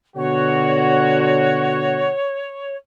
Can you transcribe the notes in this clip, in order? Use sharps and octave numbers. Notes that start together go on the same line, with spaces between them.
B2 D3 F#4 C#5